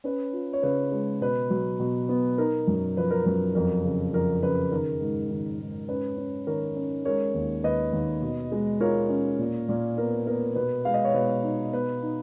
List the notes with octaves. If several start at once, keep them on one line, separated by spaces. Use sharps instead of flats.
C#4 B4
F4
C#5
C#3 B4
G#3
B2 B4
F#3
B2
B3
D#4 A#4
F#2
F3 B4
A#4
F#2 B4
F2 A#4
C#3
F2 A#4
C#3 B4
D#3 A#4
G#2
D#3
G#2
C#4 B4
C#4
D#3 A#4 C#5
C#4
G#3 A#4 C#5
D#2
D#2 B4 D#5
D#2
B2
G#3
F4 A#4 C#5
C#4
A#2
A#2
B3 A#4
B3 A#4
B2 B4
G#3 F5
D#5
C#5
B2 B4
D#4
B3 B4
D#4